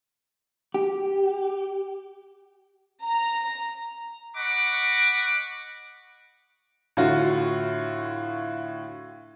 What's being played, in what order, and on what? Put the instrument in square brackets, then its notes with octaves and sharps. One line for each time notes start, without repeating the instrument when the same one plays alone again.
[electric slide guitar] G4
[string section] A#5
[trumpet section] D#5 F#5 B5 C#6 D6
[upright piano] A2 D3 F4 F#4